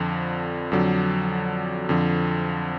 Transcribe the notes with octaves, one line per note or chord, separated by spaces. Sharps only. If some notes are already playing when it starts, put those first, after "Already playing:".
Already playing: F2 D3 F3
F2 D3 F#3
F2 D3 F3